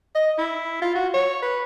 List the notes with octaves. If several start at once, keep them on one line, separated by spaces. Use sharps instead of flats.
D#5
E4
F4
F#4
C#5
B4